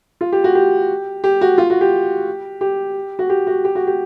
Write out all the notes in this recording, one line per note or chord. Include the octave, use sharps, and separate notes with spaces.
F4
G4
F#4
G4
G4
F#4
F4
F#4
G4
G4
F#4
G4
F#4
G4
F#4
G4